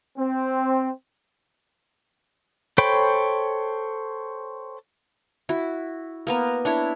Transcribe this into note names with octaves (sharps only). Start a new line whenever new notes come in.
C4
A4 C5 C#5 G5 B5
E4 F#4
A#3 B3 A#5
D4 E4 C#5